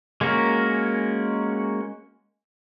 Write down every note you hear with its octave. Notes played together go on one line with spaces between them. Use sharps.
G#3 A#3 C#4 F#4 A#4